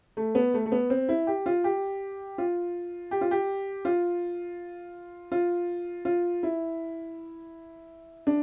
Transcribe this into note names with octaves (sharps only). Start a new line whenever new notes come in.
A3
B3
A3
A3
B3
C4
E4
G4
F4
G4
F4
G4
F4
G4
F4
F4
F4
E4
D4